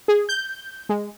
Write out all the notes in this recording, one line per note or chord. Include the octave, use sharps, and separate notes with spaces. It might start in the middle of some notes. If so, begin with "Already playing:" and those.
G#4
G6
G#3